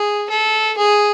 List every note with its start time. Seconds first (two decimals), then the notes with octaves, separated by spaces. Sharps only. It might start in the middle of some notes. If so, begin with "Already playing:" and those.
Already playing: G#4
0.30 A4
0.77 G#4